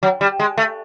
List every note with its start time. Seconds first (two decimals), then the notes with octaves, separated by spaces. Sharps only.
0.03 F#3
0.21 G3
0.39 G#3
0.58 A3